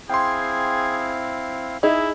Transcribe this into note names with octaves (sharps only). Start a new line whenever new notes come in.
C4 E4 G#4 F5 G5 C6
D#4 E4 G#4 D#5 E5